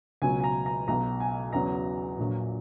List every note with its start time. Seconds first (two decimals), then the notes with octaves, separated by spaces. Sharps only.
0.22 C#2 B2 F#3 G#5
0.40 G#5
0.44 A#5
0.66 A#5
0.88 B1 B2 F#3 A#5
1.20 G#5
1.53 E2 C#3 F#3 A#5
2.18 A#1 A#2 F#3